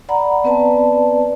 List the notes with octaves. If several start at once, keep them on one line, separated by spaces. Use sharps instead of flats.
D5 F#5 A#5 B5
B3 C4 B4 D5 A5